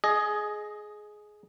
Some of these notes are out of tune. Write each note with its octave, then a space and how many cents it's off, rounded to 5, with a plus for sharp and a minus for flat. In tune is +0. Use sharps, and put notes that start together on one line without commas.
G#4 +15 D#5 +0